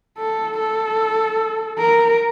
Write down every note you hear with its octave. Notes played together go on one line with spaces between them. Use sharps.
A4
A4
A#4